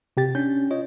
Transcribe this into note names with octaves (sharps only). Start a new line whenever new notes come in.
C3 G4 A6
C#4 D4 G6
F4 C#5 D#5